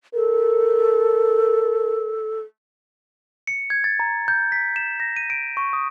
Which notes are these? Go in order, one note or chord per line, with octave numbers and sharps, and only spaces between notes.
A4 A#4
C#7
G#6
A6
A#5
G6
B6
E7
A#6
D#7
D7
C#6
D#6